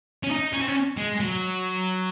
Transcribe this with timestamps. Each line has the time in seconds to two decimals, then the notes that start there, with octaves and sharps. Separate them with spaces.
0.23 C#4
0.31 D#4
0.53 C#4
0.61 C4
0.68 C#4
0.97 G#3
1.20 F#3